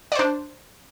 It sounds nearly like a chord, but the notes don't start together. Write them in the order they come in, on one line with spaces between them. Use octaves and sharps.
D5 C5 D4